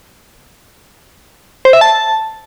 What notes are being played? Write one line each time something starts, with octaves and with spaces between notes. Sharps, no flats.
C5
E5
A5